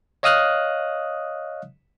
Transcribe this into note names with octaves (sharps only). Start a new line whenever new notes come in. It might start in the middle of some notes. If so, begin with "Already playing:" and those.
C#5 D#5 F5 D#6 F6 F#6